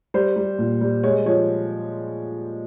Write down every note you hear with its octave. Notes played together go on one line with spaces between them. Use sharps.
G3 C5
G3
A#2
G3
G#3 C#5
F3 C#5